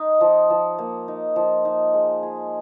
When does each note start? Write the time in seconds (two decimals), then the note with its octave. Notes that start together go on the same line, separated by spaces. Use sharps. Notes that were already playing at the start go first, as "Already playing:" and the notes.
Already playing: D#4
0.21 F3
0.50 F3
0.78 A#3
1.08 D#4
1.36 F3
1.65 D#4
1.94 G#3
2.23 G#4